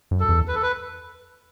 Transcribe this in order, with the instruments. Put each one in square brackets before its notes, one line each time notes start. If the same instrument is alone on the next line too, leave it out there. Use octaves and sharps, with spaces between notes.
[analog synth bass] F#2
[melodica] A4
[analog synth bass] E2
[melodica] B4
A4
B4